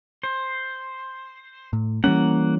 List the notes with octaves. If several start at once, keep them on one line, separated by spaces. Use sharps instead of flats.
C5
A2
E3 G3 A#3 C#4 F#5